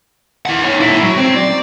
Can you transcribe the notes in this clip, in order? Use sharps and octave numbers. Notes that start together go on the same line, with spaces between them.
E4 F#5
D#4 C#5
A#2 E4
F#3
C4
D5